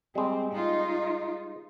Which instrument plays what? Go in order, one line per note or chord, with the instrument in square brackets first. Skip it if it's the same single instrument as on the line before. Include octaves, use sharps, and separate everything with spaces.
[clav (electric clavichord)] G3 G#3 [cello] C4
[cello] D#4 F4